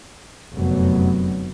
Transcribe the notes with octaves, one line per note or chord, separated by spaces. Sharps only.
F1 F#2 D3 F#3 B3